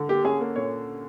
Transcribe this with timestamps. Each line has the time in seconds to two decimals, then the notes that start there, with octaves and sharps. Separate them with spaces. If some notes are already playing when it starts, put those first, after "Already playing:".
Already playing: D3
0.09 A#3 G4
0.24 C#4 G#4
0.41 A#3
0.56 A#2 C#5